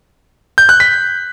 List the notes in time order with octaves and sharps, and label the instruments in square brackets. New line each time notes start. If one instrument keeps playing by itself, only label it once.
[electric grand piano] G6
F#6
B6